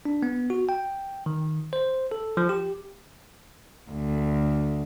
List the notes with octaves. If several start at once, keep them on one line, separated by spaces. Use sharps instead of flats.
D4
B3
F#4
G5
D#3
C5
A4
F3
G4
D2